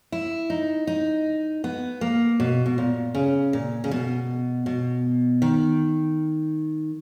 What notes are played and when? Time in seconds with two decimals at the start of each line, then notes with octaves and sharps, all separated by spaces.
0.12 E4
0.50 D#4
0.87 D#4
1.64 B3
2.01 A#3
2.40 B2
2.66 B2
2.78 A#2
3.15 C#3
3.53 A#2
3.84 C#3
3.91 B2
4.66 B2
5.42 D#3